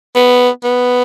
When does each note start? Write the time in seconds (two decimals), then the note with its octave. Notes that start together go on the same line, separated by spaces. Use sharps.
0.16 B3
0.64 B3